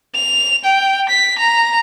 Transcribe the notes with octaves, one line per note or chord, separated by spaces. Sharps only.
F7
G5
B6
A#5